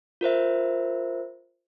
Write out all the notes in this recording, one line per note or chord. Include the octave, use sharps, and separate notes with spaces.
F4 A#4 C5 E5